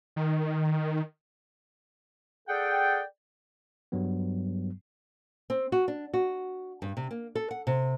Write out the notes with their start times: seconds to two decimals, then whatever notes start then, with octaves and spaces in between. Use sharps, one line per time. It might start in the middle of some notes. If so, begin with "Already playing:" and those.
0.16 D#3
2.48 G#4 A4 D5 F#5 G5
3.92 G2 F#3 G3 B3
5.50 C4
5.72 F#4
5.88 D4
6.14 F#4
6.82 G2
6.97 C3
7.11 A#3
7.35 A4
7.51 F#5
7.67 C3